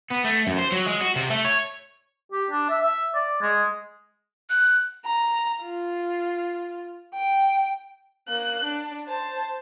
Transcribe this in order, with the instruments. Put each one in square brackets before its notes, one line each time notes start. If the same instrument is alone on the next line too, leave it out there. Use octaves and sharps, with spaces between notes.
[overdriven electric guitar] B3
A3
F#2
C5
F#3
G#3
F#4
C3
A3
C#5
[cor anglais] G4
D4
E5
E5
D5
G#3
[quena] F#6
[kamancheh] A#5
F4
G5
[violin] A#3 F#6
D4
C5 A5